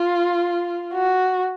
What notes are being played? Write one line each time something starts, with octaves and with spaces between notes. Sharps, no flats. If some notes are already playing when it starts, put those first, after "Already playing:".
Already playing: F4
F#4